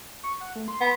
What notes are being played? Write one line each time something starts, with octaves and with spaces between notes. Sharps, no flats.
C#6
F#5
A3
C6
B3